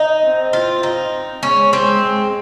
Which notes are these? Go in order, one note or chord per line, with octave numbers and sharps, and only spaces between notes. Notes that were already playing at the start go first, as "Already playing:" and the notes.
Already playing: D#4
C4
F4
D#4
G#3 C#4
G#3 C4
G#3